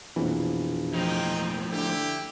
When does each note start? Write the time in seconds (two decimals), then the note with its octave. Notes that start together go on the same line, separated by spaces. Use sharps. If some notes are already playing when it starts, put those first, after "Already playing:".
0.16 A#1 F2 B2 E3
0.94 A2 F3 D#4 G5
1.72 D3 E4 G4